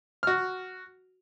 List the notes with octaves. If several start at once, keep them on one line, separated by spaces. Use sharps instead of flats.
F#4 F6